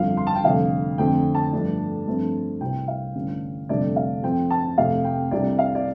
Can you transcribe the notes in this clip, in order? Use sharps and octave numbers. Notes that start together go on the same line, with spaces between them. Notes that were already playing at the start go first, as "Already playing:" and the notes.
Already playing: G1 F2 F3 F5
C6
A5
G5
F1 F2 D3 G3 F5
F2 D3 A3 C4 G5
A5
G2 F3 A3 D4
G2 F3 A3 C4
C2 C3 G3 C4 G5
F5
A1 G2 D3
G1 F2 C3 A3 D4 D5
F5
F2 F3 C4 G5
A5
F1 F2 C3 A3 F5
G5
C2 C3 G3 D4 D5
F5
D5